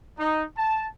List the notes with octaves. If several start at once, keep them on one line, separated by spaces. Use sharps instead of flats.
D#4
A5